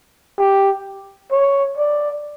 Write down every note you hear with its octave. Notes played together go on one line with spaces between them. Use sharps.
G4
C#5
D5